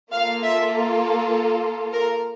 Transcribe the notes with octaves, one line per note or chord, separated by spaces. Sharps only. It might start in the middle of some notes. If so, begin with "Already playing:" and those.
A#3 F4 A4 F5
E5
A#4